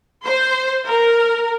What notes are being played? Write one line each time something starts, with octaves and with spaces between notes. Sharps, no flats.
C5
A#4